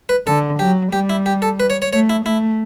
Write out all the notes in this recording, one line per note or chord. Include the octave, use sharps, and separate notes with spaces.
B4
D3 A4
F#3 G4
G3 G4
E4
G4
A4
B4
C#5
C#5
A3 C#5
E4
A3 E4